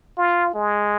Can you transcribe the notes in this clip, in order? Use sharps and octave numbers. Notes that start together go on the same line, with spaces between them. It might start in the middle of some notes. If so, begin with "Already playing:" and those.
F4
G#3